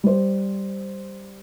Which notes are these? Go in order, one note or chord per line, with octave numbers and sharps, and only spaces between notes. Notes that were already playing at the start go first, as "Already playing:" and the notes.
G3 C5